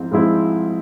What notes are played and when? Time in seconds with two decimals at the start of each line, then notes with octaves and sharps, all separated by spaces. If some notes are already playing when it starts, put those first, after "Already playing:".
Already playing: G#2 F3 C4 E4
0.11 G#2 F3 G#3 C4 E4